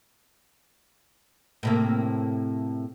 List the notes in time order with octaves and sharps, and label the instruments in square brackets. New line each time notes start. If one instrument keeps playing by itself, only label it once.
[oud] A2 C3 A#3